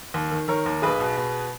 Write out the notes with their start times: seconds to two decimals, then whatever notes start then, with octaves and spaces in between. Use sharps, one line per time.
0.14 D#2
0.31 D#3
0.48 D#3 A#4 C#5
0.66 D#2
0.82 B1 G#4 B4
1.00 B2
1.17 B2